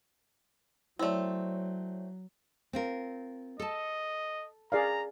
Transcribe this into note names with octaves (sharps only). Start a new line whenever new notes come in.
F#3 A3 C4 E4 C#5 D5
C4 F4 A#4
A4 D#5 A5
G#4 D5 F5 A#5